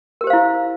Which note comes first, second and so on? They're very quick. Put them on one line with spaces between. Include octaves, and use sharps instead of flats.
A#4 G4 C5 F5 E4